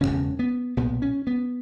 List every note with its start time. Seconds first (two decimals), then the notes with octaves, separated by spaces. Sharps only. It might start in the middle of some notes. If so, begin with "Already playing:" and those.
0.01 E1 D#2 C#3 C#4
0.39 B3
0.77 B1 A#2 B3
1.02 C#4
1.27 B3